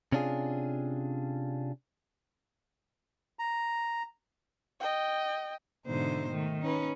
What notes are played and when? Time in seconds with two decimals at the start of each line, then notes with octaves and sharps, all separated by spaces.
0.12 C3 C#4 D4 F4 G#4
3.39 A#5
4.80 D#5 G5
5.85 G#2 B2 D3 E3 D#4 C5
6.31 D#3 A3
6.61 C#4 D#4 B4